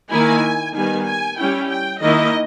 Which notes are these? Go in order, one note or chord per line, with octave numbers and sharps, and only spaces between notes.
D#3 A#3 E4 G#5
D#3 G3 B3 G#5
G#5
G3 C#4 E4 G5
G5
D#3 A#3 E4 D#5